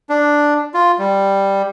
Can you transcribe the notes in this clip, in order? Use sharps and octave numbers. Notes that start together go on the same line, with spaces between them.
D4
F4
G3